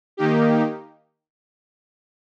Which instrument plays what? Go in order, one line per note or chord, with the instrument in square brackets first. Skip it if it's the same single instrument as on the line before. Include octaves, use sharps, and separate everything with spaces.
[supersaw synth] D#3 A#3 D#4 G4